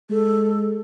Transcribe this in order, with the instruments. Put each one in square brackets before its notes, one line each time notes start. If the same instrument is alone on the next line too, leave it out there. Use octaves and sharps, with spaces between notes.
[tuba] G#3 [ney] A4